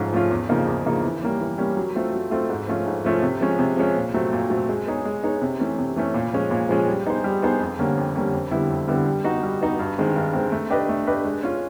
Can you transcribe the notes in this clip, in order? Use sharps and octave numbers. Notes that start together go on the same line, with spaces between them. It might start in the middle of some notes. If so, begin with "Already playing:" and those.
Already playing: G#2 F3 A3 C#4 F4
F3 A3 C#4 F4
E2
C#3 F3 A#3 D#4
E2
C#3 F3 A#3 D#4
E3
G3 A#3 C#4
E3
G3 A#3 C#4
F#3
A3 C4 F4 A4
F#3
A3 C4 F4 A4
G#2
F3 A3 C#4 F4
G#2
F3 A3 C#4 F4
C3
F3 G#3 C#4
C3
F3 G#3 C#4
A#2
F#3 A3 C4
A#2
F#3 A3 C4
G#3
B3 D#4 G#4 C#5
G#3
B3 D#4 G#4 C#5
C3
E3 A3 C#4
C3
E3 A3 C#4
A#2
F3 G#3 C#4
A#2
F3 G#3 C#4
G3
B3 D#4 G#4 C5
G3
B3 D#4 G#4 C5
F2
D3 G3 A#3 C#4
F2
D3 G3 A#3 C#4
F2
D3 G3 B3 E4
F2
D3 G3 B3 E4
G3
B3 D#4 F#4
G3
B3 D#4 F#4
G2
D#3 G#3 C4
G2
D#3 G#3 C4
A3
D4 G4 B4 D#5
A3
D4 G4 B4 D#5
G#3
C#4 F4